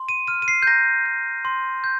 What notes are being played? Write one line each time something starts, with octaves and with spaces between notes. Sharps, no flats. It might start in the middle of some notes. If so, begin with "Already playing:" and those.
Already playing: C6
D#7
F6 D#7
D#7
C7
G6
A#5 A#6
G6
C6
G6